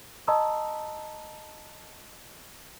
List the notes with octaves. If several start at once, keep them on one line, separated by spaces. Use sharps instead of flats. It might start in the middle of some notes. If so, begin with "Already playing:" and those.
D#5 A5 A#5 C6 D#6 E6